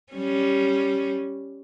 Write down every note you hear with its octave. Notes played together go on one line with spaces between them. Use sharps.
G3 C#4